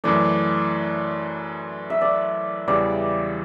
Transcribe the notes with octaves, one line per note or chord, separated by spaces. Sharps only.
F#2 E3 A3 D5
E5
D5
E2 C#3 E3 G3 D5